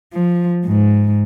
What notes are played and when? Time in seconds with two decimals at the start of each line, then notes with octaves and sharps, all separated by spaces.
0.14 F3
0.66 G#2